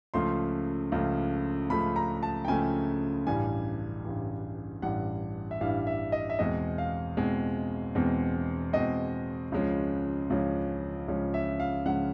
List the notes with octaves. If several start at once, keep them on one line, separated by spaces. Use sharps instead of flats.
C#2 C#3 F3 A3 C6
C#2 C#3 F3 A3
C#2 C#3 F3 A3 B5
A#5
A5
G5
C#2 C#3 F3 A3 G#5
A1 G2 E3 G3 G#5
A1 G2 E3 G3
A1 G2 E3 G3 F#5
E5
A1 G2 E3 G3 F5
E5
D#5
E5
E2 B2 G#3 C4 D#5
F5
E2 B2 G#3 C4
E2 B2 G#3 C4
E2 B2 G#3 C4 D#5
C#2 C#3 F3 G#3 C#4
C#2 C#3 F3 G#3 C#4
C#2 C#3 F3 G#3 C#4
E5
F5
C#2 C#3 F3 G#3 C#4 F#5